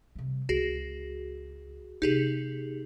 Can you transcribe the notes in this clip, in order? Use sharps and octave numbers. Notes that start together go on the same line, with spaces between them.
C3 G3
C#2 F#4 G#4
C3 A#3 D#4 G4 G#4